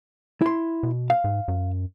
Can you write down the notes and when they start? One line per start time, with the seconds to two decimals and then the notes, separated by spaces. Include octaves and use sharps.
0.42 E4 C6
0.83 B2
1.10 F5
1.24 G#2
1.48 F#2